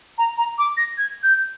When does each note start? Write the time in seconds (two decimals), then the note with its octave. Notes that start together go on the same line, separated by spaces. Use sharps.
0.18 A#5
0.38 A#5
0.58 D6
0.77 A#6
0.98 G#6
1.23 G6